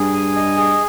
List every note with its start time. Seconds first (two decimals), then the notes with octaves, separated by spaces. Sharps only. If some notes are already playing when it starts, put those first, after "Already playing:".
Already playing: G2 G#4
0.14 G#5
0.36 D#5
0.56 G#4